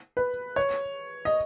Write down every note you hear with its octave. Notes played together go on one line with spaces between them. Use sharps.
B4
C#5
D#5